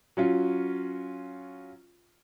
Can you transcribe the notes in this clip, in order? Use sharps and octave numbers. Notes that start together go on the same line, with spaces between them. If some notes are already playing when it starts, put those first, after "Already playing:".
F#3 C#4 F4